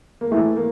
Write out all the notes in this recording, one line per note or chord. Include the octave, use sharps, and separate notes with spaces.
A#3
E3 A3
A#3